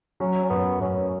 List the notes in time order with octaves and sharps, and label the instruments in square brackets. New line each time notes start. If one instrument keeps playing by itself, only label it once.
[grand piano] F#3 [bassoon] C#4
[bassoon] C#4
[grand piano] F#2 [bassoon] B3
[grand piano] F#2 [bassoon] C#4